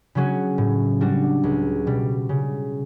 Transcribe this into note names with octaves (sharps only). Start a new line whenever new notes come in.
C#3 F#3 C#4 F#4
A2
G3 D4 F#4
C#2
B2 G3
C#3